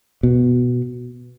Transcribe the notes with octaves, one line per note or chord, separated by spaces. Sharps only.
B2